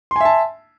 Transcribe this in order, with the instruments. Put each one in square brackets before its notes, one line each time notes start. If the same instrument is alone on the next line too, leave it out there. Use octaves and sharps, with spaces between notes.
[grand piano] C6
G#5
E5
A5